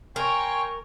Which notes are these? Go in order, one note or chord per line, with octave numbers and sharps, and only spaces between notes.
A#4 C#5 G5 G#5 C6 C#6